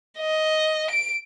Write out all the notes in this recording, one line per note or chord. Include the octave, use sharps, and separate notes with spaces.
D#5
D7